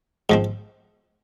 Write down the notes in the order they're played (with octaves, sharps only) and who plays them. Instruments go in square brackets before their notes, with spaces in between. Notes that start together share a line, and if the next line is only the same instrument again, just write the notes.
[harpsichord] G#2 F3 C4